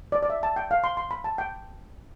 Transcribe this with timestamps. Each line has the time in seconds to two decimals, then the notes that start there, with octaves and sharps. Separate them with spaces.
0.12 D5
0.23 D5
0.30 E5
0.43 A5
0.56 G5
0.71 F5
0.84 C6
0.97 C6
1.11 B5
1.24 A5
1.38 G5